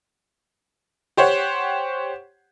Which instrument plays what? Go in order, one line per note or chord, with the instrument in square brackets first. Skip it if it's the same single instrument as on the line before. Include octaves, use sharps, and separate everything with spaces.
[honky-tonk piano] G4 C5 C#5 F#5